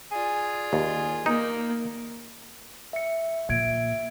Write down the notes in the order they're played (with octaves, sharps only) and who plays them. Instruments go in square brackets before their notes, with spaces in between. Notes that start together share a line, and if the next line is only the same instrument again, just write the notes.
[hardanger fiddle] F4 D5 [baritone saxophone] G#4
[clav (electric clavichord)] D#2
[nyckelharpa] A#3 [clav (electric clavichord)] D#4
[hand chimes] E5 C#7
[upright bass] A#2 F3 [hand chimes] E5 G#6 D7